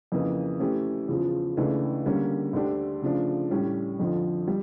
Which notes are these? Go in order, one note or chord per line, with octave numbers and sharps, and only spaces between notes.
F2 C#3 E3 A#3
E3 A3 C#4 G4
E2 C#3 F3
C#2 C#3 E3 A3 D4
D3 G3 A#3 C#4
D2 D3 A3 D4 G4
C#3 F3 A3 D4 F4
A2 G3 C#4
F2 D3 F3
G3